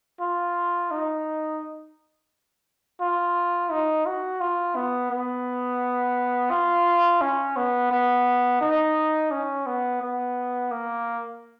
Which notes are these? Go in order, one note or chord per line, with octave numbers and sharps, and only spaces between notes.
F4
D#4
F4
D#4
F#4
F4
B3
B3
F4
C#4
B3
B3
D#4
C#4
B3
B3
A#3